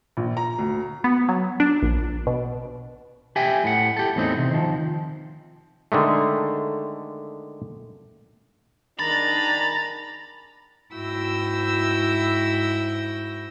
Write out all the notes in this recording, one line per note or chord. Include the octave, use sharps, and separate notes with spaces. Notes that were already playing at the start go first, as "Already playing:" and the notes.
A#1
A#5
D2
B3
F#3
D4
A#1
B2
G4 E5 G5 G#5
A2 F#5
G4 A4
E2 A2 C4 D#4
C3
D#3 F3
D3 D#3 G#3 A3
D#3 D4 G#4 A#5 B5 A6
G#2 E4 F#4 G5 E6 A#6